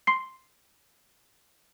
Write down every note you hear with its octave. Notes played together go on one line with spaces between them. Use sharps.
C6 C7